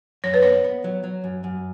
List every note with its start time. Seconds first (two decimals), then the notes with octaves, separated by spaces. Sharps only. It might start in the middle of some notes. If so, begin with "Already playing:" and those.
0.24 F#2 C#5
0.34 B4
0.43 B3 C#5
0.64 B3
0.84 F#3
1.04 F#3
1.24 F#2
1.44 F#2